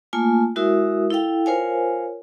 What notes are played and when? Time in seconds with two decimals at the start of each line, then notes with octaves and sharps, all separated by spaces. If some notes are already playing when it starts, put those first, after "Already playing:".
0.13 A3 A#3 F4 G#5 A5
0.56 G#3 E4 F#4 A#4 E5 D#6
1.10 E4 A4 F5 G5
1.46 F4 A#4 C5 C#5 F5 G#5